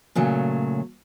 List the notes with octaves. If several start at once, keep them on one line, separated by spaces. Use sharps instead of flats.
A#2 C#3 F#3 A3